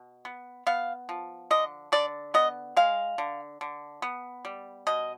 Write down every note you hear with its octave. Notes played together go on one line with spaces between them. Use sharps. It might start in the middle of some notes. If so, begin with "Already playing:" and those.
Already playing: B2
B3
B3 F5
F3
D3 D#5
D3 D5
B3 D#5
G#3 F5
D3
D3
B3
G3
B2 D#5